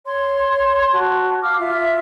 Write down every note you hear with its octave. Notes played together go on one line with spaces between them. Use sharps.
C#5 C6
F#4 A5
F5 D6 F6
F4 E5